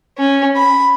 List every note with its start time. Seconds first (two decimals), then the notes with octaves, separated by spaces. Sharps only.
0.18 C#4
0.56 B5